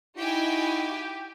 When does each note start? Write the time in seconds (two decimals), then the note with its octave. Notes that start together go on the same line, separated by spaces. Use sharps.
0.17 D#4 E4 F#4 G4 G5 G#5